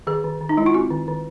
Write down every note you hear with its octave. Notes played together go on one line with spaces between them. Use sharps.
D#3 G#4
D#3
D#3
D#4
G#3 E4
F4
C4 F#4
D#3
D#3